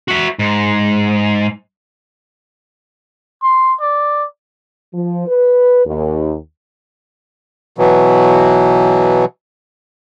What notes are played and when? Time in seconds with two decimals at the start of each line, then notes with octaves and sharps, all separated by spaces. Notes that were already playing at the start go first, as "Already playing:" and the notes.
0.08 F#4 E5
0.39 G#2
3.43 C6
3.81 D5
4.94 F3
5.27 B4
5.86 D#2
7.78 B2 E3 F#3